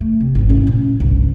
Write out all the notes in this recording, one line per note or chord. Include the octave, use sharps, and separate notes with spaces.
A3
C3
G#1 F2
C#4 E4
A#2
G1 C2